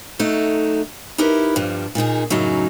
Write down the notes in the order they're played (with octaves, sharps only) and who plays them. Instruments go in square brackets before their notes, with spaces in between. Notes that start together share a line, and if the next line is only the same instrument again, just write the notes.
[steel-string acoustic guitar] F#3 A3 D#4
D#4 E4 G4 A#4 B4
G2 F3 G3
A#2 D#3 D#4 G#4
F#2 A2 C#3 F#3 D#4